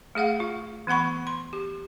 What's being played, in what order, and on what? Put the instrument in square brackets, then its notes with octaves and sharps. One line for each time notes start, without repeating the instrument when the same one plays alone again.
[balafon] A3 G#4 F5 F#5
F4
E3 B3 F#5 B5 C#6
C6
G4